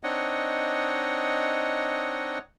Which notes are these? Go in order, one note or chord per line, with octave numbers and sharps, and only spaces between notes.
C4 D4 D#4 C#5 D#5 F#5